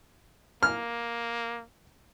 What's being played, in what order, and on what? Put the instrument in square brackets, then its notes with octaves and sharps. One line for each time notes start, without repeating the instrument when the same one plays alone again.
[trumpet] A#3 [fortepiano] F6